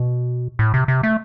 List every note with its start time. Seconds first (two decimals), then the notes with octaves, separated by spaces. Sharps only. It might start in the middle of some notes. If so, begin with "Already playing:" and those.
Already playing: B2
0.59 A2
0.74 C3
0.88 C3
1.03 A3